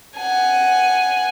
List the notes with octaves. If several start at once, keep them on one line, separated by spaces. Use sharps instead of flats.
F#5 G#5